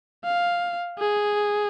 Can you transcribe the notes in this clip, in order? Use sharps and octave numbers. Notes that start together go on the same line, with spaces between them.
F5
G#4